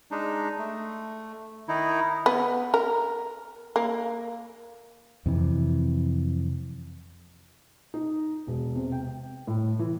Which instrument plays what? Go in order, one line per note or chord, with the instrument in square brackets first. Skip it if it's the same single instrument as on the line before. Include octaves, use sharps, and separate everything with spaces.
[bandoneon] G#3 D4 D#4
A3
D#3 D#4 E4
[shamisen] B3
A#4
A#3
[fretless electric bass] F2 C3 E3
[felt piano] D#4
E1
C3
G5
A2
E3